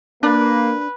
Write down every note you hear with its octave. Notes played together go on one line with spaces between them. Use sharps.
A#3 D4 B4 D5